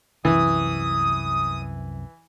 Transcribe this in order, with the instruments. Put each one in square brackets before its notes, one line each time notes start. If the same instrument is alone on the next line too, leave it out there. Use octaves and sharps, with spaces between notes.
[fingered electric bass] C2 F#2 C3 [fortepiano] E3 [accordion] D#6